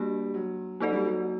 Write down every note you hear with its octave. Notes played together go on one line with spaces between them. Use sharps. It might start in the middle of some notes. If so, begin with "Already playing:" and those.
Already playing: G3 A#3 D4 F#4
F#3
F#3 A#3 D#4 F#4 A4 D5
G3
F#3